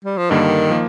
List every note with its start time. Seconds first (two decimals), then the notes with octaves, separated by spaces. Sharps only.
0.04 G3
0.17 F3
0.30 G2 D3 D#3 G3 A#3
0.70 F3 A#3